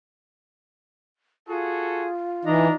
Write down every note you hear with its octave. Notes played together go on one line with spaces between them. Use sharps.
F4 F#4 G#4 A4
E3 D4 D#4 A#5